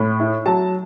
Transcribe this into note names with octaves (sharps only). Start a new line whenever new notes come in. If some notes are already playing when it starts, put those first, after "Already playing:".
Already playing: A2 B5
E4
F#3 A5